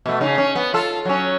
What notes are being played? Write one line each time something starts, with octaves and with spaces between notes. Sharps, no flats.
B2 A3
C#3 D#4
C#4
B3
F4 A4
F#3 C#4